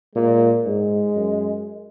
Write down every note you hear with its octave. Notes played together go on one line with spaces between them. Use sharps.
A#2 G#3
G#2 G#3
F#2